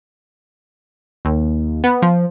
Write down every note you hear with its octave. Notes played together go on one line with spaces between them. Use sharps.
D#2
B3
F3